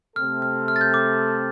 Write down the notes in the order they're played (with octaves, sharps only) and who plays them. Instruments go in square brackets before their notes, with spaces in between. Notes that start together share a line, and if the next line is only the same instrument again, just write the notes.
[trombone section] C3 A3 C4 A4 [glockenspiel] F6
[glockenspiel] F6
F6
A6
G6
D6